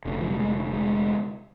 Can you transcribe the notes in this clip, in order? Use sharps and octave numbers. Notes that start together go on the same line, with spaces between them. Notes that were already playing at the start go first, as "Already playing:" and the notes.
F1 F2 D3
F3
G3
G#3
G#3